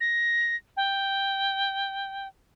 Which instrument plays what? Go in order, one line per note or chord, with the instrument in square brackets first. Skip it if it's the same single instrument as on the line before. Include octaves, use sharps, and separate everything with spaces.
[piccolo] A#6
G5